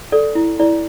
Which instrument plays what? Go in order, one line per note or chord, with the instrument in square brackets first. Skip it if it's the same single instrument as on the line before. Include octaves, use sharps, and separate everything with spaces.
[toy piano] A4 D5
E4
E4 D5